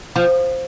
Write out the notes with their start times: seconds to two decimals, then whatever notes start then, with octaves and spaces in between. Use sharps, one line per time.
0.16 F3